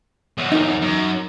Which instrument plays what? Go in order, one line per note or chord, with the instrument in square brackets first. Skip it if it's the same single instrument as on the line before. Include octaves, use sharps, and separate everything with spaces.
[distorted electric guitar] E2 F#3
[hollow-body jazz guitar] D#4 A#4
[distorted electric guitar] F#2